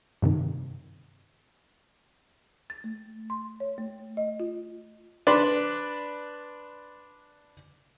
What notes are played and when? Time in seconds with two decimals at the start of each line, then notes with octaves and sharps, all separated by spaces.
0.22 G2 C3 D#3
2.70 A6
2.84 A3
3.30 C6
3.60 C#5
3.78 A3
4.17 D#5
4.40 F4
5.27 D4 B4 D5 B5 C6